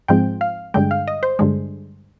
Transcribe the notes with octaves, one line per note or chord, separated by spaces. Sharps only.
G#2 F3 G#3 C4 G5
F5
G2 D3 G#3 G5
F5
D#5
C5
G2 D3 G#3